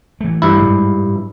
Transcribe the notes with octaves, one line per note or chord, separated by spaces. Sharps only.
E3 A3
G2 E4
G#2 G3 G#3